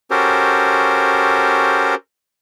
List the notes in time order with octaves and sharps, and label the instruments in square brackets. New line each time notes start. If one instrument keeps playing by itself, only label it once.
[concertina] C#4 F#4 G4 A4 A#4 C5